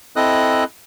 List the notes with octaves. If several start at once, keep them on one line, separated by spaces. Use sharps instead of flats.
C4 E4 A4 D#5 D#6 F#6